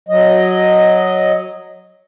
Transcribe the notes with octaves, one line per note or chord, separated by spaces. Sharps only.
F#3 D#5